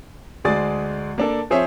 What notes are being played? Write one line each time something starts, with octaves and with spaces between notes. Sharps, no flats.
D2 G#3 G#4 D5 A6
A#3 D4 A4
F3 C4 G#4 C5 C#5 E5